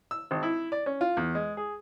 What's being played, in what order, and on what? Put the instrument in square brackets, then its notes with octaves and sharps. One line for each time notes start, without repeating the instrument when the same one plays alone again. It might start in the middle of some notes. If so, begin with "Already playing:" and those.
[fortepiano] E6
G#1
E4
D5
C#4
F4
E2
G#3
G#4